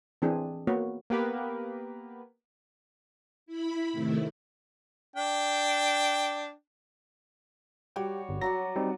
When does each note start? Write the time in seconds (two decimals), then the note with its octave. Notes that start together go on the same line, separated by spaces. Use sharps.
0.22 E3 C4 D4 G#4
0.67 A#3 B3 F#4 A#4 C#5
1.10 A#3 B3 G4 A#4 B4
3.46 E4 B5
3.92 A2 C3 D#3 A3 E4
5.16 D4 G5
7.96 G3 F#4 G4 C#5 G5
8.29 G1
8.41 F#3 F#4 D5 A#6
8.76 G3 C4 D#4